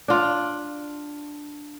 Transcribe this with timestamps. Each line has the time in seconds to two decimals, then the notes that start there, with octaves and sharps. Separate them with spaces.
0.08 D4 F4